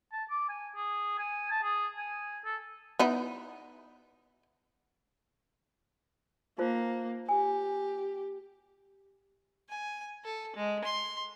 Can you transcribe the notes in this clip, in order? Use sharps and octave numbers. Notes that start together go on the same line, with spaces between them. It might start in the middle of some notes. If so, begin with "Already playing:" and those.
A5
D6
G#5
G#4
G#5
A5
G#4
G#5
A4
B3 D#4 E4
A#3 D#4 F4 C5
G4 G#5
G#5
A4
G#3
C6